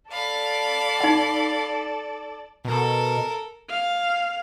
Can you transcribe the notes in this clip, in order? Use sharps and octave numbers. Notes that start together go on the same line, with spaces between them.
A4 D5 F5 B5
D#4 F#5
B2 A4 A#4
F5